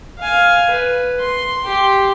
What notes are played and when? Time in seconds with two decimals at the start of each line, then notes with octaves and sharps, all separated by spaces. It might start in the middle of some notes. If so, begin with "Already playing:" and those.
0.19 F5 G#5
0.70 B4
1.20 C6
1.63 G4 C6